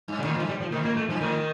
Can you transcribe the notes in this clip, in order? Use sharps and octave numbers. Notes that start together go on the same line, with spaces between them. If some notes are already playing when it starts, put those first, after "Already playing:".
G2
D3
A2 D#3
F3
G2
G3
F3
A2 D#3
A#3
A3
G2 F3
A2 D#3